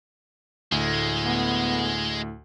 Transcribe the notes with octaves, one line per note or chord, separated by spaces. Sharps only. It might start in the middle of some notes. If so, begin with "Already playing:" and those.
D2 A2 G#3
B3